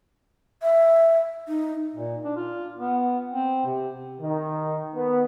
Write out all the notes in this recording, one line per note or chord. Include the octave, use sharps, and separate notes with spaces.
E5
D#4
A#2
D4
F4
B3
C4
C3
D#3
B3